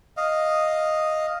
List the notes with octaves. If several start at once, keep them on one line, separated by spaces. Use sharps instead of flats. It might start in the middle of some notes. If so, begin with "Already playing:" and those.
D#5 F5